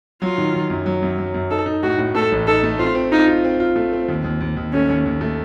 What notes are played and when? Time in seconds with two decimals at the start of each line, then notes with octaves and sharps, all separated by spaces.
0.22 F#3 F4
0.38 D#3
0.54 D#3
0.70 F#2
0.86 F#3
1.03 F#2
1.18 F#3
1.34 F#2
1.50 D#4 A4
1.66 D#4
1.83 A2 F#4
1.98 A2
2.15 A3 A4
2.32 A1
2.47 D#4 A4
2.64 A3
2.79 C4 F4
2.95 C4
3.12 D#4 F4
3.27 F4
3.44 C4
3.60 F4
3.76 A3
3.93 C4
4.08 D#2
4.24 D#2
4.41 D#2
4.57 D#2
4.73 A3 C#4
4.89 D#2
5.06 D#2
5.21 A3